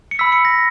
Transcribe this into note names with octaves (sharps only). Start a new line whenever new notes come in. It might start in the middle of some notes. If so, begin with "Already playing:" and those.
C#7
B5 E6 B6
C#7
A#6